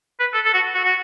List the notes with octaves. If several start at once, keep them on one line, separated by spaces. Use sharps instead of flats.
B4
A4
A4
F#4
F#4
F#4